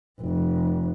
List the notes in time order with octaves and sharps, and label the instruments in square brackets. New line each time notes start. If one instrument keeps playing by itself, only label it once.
[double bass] F1